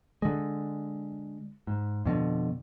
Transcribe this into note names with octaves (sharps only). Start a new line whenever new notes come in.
D3 G#3
G#2
F2 B2 D3